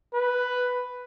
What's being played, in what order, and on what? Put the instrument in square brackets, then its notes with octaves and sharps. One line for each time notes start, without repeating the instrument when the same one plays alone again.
[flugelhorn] B4